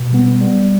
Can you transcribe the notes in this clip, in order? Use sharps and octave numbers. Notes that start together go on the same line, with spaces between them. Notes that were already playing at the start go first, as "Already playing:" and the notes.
Already playing: B2
G3 B3
G3